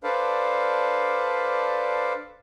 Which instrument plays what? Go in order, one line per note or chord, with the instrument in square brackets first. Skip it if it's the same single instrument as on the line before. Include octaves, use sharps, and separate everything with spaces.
[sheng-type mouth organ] D4 A4 B4 C5 D5 F5